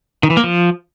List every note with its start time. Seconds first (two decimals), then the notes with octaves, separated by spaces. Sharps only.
0.23 D#3
0.30 E3
0.37 A#3
0.44 F3